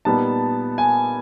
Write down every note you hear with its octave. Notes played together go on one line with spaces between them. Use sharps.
A#2 G3 B3 D#4 A5
G#5